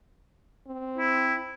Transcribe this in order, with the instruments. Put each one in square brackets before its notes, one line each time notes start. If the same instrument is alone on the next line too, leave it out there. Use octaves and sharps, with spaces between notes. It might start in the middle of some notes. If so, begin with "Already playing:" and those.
[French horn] C4
[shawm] E4